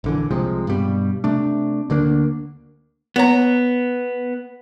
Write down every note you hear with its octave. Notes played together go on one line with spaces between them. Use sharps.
A#1 D3 E3
C2 C3 F3 G#3
G2 B2 G3
C3 A3 D4
D2 D3 A#3 D4
B3 C#5 A#5